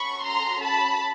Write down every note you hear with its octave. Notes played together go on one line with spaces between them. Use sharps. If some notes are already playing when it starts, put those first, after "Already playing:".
Already playing: C#4 F#4 A4 B5 C#6
A#5 C6
A5 B5